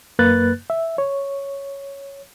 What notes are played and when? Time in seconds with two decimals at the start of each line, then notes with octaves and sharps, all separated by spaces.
0.19 F#2 A#3 B4 F#6 A6
0.70 E5
0.98 C#5